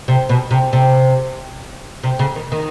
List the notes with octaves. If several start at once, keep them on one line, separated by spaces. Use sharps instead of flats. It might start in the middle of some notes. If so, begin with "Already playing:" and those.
C3
B2
C3
C3
C3
C#3
D#3
D#3